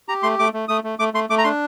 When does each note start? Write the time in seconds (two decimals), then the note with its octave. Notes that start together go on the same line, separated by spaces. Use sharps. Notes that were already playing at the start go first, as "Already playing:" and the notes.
0.08 G4 A#5
0.23 A3 C6
0.39 A3 D6
0.53 A3
0.68 A3 D#6
0.84 A3
0.99 A3 D6
1.14 A3 C6
1.30 A3 D6
1.38 A#5
1.44 D4 C6